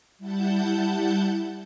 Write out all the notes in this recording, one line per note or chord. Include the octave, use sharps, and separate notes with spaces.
G3 E4 F#5 A5 G6